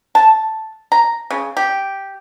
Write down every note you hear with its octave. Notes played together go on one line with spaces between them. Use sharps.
A5
A#5
C#3
G4